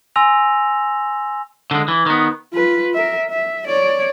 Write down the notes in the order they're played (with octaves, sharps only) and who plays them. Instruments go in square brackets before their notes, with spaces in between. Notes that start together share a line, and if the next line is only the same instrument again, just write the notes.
[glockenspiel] G#5 C6 E6 A#6 F7
[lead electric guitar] D3 G#3
E3
D#3 B3
[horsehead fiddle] F4 B4
A#4 E5
E5
C#5 D5